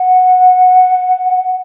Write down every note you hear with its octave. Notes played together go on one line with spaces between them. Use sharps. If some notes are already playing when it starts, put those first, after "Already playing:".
Already playing: F#5